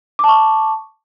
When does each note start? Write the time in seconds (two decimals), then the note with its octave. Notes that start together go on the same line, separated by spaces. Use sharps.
0.19 D6
0.24 A5
0.28 C#6